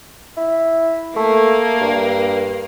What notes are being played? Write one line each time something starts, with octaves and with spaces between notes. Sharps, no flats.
E4
A3 A#3
G2